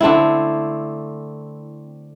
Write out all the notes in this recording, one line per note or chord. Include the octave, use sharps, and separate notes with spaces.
D3 A3 C4 E4